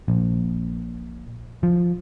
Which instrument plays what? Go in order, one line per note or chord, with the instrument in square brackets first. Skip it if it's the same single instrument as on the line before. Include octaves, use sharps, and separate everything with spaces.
[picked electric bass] A#1
F3